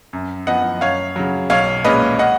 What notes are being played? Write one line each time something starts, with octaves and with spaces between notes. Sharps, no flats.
F#2
F3 B3 D#5 F#5
F#2 C#5 F5
C#3 F#3
B1 C#5 F5
A#2 G#3 C#4 B4 D#5
D#5 F#5